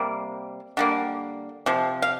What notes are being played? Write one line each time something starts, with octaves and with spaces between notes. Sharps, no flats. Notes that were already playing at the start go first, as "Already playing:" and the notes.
Already playing: C3 G3 A#3
D3 G3 A#3
C3 F3
F5